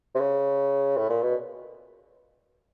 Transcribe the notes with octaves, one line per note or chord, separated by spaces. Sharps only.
C3
C#3
A2
A#2
B2